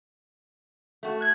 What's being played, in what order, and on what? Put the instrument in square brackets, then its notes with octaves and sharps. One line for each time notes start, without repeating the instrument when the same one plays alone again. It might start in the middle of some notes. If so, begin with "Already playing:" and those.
[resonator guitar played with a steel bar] A3 F#4
[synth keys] F#6 G#6